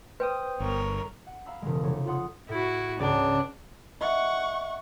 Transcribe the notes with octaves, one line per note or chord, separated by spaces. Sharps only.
B4 C5 G5 D#6
G1 A#4 C#5
F#5
F5 A#5 B5 E6 C7
E1 C#3 G#3
F1 G4 C#5
F4 A4 F#5 C6 D#6
A2 E4 F#4
C#2 G#2 D4
D#5 E5 F#5 C#6